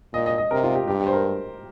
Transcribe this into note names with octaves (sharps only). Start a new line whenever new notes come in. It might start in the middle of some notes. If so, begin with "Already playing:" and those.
A#2 D#5
D#5
D#5
C3 A#4
F4
G4
G2 G4
G4
C5
A#4